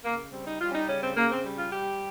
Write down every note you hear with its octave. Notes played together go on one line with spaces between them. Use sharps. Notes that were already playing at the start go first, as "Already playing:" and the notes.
C#3 A#3
G3 C4
D#4
G3 F4
C#4
D#4
C#3 C#4
C4
C#3 A#3
C4
G3
F4
G3 G4